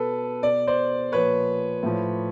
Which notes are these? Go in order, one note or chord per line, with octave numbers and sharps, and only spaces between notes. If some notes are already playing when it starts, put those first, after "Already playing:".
Already playing: B2 A4 B4
B2 D5
C5 D5
A#2 F3 B4 C#5
A2 F3